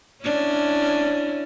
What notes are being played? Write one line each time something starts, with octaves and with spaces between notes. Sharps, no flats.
C#4 D4 E4